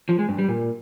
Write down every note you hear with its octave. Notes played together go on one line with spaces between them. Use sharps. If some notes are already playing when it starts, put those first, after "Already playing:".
F3
G#3
G2
G3
A#2